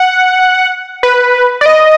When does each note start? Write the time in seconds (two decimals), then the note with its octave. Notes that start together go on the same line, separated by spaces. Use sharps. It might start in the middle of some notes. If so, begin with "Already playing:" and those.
Already playing: F#5
1.03 B4
1.61 D5
1.66 D#5